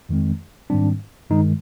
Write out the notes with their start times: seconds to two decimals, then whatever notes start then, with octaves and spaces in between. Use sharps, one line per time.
0.09 F2 D#3 G#3 C4
0.70 G#2 D#3 G3 C4 D4
1.30 G2 D#3 G#3 D#4